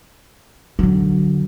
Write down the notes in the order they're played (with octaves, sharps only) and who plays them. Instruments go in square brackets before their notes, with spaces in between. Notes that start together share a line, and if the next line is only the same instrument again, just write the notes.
[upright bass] D3 F#3